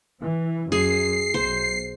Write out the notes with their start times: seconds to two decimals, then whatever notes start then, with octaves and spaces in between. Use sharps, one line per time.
0.21 E3
0.72 F#2 G#4 C7
1.34 B1 C5